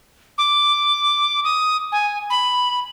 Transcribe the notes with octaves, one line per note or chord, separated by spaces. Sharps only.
D6
D#6
G#5
B5